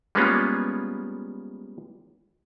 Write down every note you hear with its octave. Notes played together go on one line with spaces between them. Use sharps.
G3 G#3 A#3 B3 C#4 F4